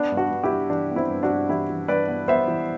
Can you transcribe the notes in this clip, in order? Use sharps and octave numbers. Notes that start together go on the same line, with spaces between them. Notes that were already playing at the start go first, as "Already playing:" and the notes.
Already playing: B3 D4
G2
D4 F#4
G2
E4 G4
G2
E3 D4
B3
C4 E4
G2
D4 F#4
G2
E3 E4 G4
E3
G2 B4 D5
B3
B3 C5 E5
E3